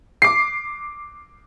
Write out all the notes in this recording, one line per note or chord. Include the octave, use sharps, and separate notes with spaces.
D6 C7